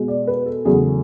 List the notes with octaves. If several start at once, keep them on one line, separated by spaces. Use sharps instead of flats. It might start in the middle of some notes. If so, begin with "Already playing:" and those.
Already playing: B2 G#3
D5
B4
A4
E2 C#3 F#3 A3 G#4